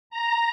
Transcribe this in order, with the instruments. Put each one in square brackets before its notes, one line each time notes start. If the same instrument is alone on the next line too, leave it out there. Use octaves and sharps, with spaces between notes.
[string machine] A#5